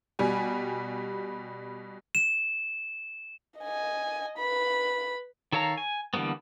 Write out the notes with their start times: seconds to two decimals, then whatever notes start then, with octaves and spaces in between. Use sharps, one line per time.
0.19 B2 G3 G#5
2.15 E7
3.60 D#5 G#5
4.38 B4 B5
5.52 D#3 A4 C#5 F5 A#5
5.78 G#5
6.14 D3 E3 G3 A#3 B3